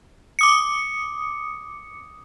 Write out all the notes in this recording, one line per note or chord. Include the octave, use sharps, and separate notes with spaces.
D6 D#6 C#7